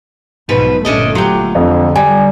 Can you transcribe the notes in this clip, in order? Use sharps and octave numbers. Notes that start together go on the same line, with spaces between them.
B1 G#2 B2 F3 B4
G1 A#2 A3 C#4 D4 D#5
F#3 F4 G4
F2 D3
G3 G#5